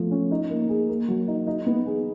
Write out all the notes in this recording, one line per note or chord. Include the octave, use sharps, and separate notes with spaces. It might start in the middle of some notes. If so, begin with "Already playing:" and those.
Already playing: F3 A3 B3
C#4
D#4
A#3
G#4
A#3
F#3
D#4
D#4
B3
G#4